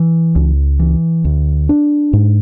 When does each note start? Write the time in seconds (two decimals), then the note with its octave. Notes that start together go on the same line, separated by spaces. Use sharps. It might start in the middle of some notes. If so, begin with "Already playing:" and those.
Already playing: E3
0.35 C#2
0.79 E3
1.24 D2
1.69 D4
2.13 G#2